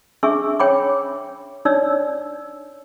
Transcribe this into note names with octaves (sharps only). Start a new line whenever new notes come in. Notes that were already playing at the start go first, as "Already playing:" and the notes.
D4 G#4 E5 G#5 C#6 E6
C#5 G5 G#5 B5 D6
D4 D#4 C#5 D5 E6